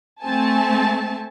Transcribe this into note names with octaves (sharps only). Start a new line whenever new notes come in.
A3 C4 G#5 A5